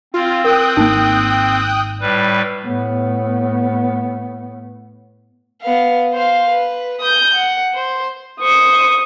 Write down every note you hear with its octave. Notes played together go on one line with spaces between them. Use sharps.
C4 F4
A#4 G5 D#6 F#6
G#1 A#3 D#4
A2 G3 B4
A2 B3
B3 F5
C5 F5
B4
D#6 G6
F#5
C5
C5 C#6 D#6